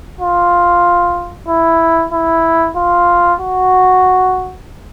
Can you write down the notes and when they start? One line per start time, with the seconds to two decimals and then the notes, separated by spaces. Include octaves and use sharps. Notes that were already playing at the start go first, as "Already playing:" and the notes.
0.21 F4
1.49 E4
2.13 E4
2.76 F4
3.40 F#4